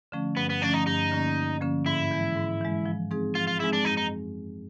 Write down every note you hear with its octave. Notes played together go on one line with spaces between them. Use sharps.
D3 F3 A3 C#4
G2 B3
B3
D3 F3 A3 C#4 D4
D#4
G2 D#4
D3 F3 A#3 C#4
G2
D3 F3 A#3 C#4
G#2 E4
E3 G#3
G#2
E3 G#3
F3
G#3 C4 D#4 G#4
F3 F4
F4
G#3 C4 D#4 E4 G#4
D4
F#2 D#4
D#4